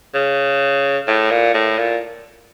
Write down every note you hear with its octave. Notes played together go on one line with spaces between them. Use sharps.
C#3
A2
A#2
A2
A#2